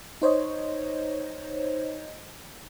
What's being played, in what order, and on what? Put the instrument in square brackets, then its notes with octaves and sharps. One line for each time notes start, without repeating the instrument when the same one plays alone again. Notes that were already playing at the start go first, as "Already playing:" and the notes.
[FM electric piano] D#4 C5 C#5 D#5